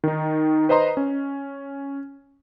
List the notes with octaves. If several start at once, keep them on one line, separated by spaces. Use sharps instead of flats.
D#3 D#4
B4 C5 D#5 A#5 C6
C#4